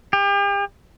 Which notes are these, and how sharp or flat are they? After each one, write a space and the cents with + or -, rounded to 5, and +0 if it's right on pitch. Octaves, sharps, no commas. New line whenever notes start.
G4 +40